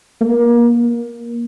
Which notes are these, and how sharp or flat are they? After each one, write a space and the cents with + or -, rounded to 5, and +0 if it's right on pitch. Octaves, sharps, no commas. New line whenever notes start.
A#3 +30
A#3 +15